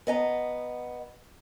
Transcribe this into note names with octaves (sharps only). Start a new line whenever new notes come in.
B3 D#5 G#5 A#5